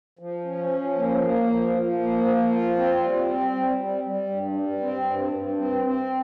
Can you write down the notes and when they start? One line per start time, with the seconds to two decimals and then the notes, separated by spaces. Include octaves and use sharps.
0.19 F3
0.45 C#4
0.70 F3
0.96 A#3
1.22 A#3
1.47 F3
1.73 F3
1.99 A#3
2.24 F3
2.50 F4
2.76 C4
3.01 G3
3.27 C4
3.52 G3
3.78 G3
4.04 G3
4.30 G2
4.55 G3
4.81 C4
5.06 G2
5.33 G2
5.57 C4
5.83 C4